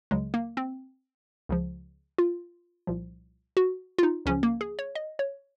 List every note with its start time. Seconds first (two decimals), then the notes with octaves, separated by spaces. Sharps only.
0.11 C#2 C#3 F#3 G#3
0.34 A#3
0.57 C4
1.49 C#2 C#3 F3
2.18 F4
2.87 C2 A#2 F3
3.57 F#4
3.98 F4
4.03 D#4
4.26 C#2 C#3 F3 C#4
4.43 A#3
4.61 G#4
4.79 C#5
4.95 D#5
5.19 C#5